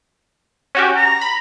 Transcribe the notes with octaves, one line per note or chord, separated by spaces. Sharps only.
C#4 F#4 G4
A#5
B5